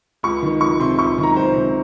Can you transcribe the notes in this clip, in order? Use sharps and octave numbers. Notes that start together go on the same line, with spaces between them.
C#2 C#6
D#3
C#2 C#6
C3 C6
C#2 C#6
D#3
A#5
C#2 C5
C3